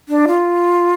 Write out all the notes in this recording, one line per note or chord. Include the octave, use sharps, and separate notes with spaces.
D4
F4